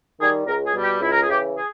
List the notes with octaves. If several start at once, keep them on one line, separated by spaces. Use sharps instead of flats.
D#3 G3 G#4
C#2 A#4
G#4
B2 G3
G4
C#2 E4
A#4
G#4
C#3 E3 G4
G#4